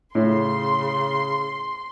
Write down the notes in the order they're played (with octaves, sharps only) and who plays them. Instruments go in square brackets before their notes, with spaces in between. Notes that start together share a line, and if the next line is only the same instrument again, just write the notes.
[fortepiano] A2 [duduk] C#3 [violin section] C6